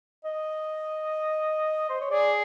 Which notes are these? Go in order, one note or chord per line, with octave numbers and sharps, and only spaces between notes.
D#5
C5
C#5
G#4 D5